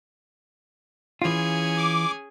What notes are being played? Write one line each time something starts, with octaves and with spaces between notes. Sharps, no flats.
E3 C#4 F4 G#4
D6